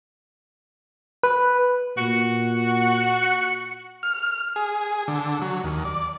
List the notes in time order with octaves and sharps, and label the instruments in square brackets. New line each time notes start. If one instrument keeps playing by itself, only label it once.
[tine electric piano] B4
[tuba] A#2 [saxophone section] F#4
[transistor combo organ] F6
G#4
D3
F#3
D#2
D5